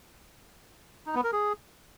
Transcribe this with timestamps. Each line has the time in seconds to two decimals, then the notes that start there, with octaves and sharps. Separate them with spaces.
1.07 D#4
1.15 B3
1.24 A#4
1.33 G#4